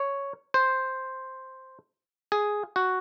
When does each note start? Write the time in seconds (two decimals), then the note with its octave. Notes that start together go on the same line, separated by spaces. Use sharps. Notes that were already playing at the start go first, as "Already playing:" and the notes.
Already playing: C#5
0.54 C5
2.32 G#4
2.76 F#4